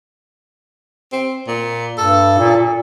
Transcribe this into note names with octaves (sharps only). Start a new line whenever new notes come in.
C4
A#2
G2 A4
A#2
A#2